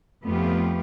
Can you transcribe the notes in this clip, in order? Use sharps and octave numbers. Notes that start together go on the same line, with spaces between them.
F2 A3 B3 F4 G4